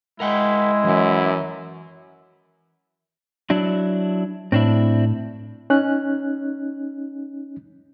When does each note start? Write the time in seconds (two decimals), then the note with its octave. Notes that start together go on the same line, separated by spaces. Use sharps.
0.20 G#3 E4 A#4 F#5 G5
0.84 F#2 E3 F3
3.50 F#3 D4 E4
4.52 A2 C4 D4 E4
5.70 C#4 D#4 F#6